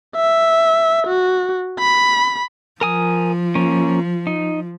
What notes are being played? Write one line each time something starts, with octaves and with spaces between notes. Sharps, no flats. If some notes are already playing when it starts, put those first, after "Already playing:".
E5
F#4
B5
F3 A#4 G#5 D#6
A#3 C#4
D#4